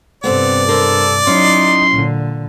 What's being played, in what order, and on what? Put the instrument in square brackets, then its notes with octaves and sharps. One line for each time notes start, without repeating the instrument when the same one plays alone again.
[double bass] G2 C3 [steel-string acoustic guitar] B3 C4 A4 [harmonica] D5
[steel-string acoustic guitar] D4 A#4 C5 [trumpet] A4
[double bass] F#3 D#4 [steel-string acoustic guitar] C#4 E4 [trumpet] C6
[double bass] A#2 D3